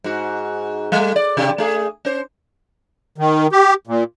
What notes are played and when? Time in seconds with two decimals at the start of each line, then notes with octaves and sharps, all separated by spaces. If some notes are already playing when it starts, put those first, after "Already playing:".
0.04 G#2 F#4
0.92 G3 A3
1.16 D5
1.37 C3 G4
1.58 A3 G#4
2.05 C#4 C5
3.18 D#3
3.52 G4
3.87 A#2